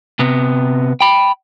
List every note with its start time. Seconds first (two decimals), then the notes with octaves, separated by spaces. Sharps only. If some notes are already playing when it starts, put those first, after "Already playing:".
0.19 C3 B3
1.01 G5 B5